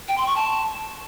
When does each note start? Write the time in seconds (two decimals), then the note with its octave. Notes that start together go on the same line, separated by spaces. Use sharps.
0.08 G5
0.18 C6
0.27 C#6
0.36 A5